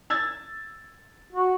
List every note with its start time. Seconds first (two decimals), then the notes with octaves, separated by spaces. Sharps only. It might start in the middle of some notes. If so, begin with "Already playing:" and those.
0.10 E6 G#6 A6
1.32 F#4